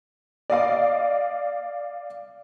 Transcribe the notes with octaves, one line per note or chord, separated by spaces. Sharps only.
D5 D#5 F5 D6